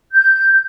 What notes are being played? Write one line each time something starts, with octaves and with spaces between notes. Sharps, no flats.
G6